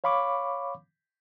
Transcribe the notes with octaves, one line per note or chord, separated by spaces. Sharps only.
C#5 F5 B5 C#6 D6